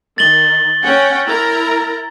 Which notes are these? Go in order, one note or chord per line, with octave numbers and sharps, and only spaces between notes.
D#3 A6 F#7 G7
C#4 F#5 G5
E4 A#4 A#5